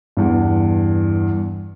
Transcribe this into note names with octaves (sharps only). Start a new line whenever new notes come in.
E2 G2